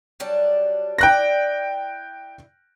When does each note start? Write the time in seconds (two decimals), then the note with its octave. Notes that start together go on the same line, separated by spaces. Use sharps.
0.20 F#3 G3 D4
0.98 E4 D5 G5 F#6 A#6